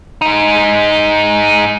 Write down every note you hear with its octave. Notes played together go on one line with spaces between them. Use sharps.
G#2 D#4